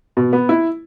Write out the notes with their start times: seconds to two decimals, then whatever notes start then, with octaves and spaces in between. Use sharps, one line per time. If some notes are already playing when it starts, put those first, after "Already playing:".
0.17 B2
0.33 B3
0.49 E4